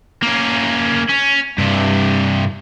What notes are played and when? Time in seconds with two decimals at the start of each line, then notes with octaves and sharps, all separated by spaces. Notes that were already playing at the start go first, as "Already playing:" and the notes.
0.23 A#3 C#4
1.09 C#4
1.58 G2 C3